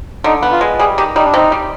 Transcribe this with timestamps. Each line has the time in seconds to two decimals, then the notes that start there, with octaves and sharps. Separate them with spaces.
0.24 D3 D#4
0.43 B3
0.52 F4
0.61 G#3
0.79 G3 G#4
0.98 D#3 G4
1.16 G3 D#4
1.25 D4
1.34 C3 D#4
1.52 G3